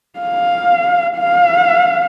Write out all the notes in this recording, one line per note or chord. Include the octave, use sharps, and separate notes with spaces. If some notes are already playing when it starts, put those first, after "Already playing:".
F5
F5